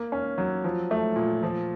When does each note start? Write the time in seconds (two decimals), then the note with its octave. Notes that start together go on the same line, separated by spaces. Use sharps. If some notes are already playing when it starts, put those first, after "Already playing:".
Already playing: A#3
0.12 C#4
0.38 F#3
0.64 F3
0.91 A3
1.16 A#2
1.43 F3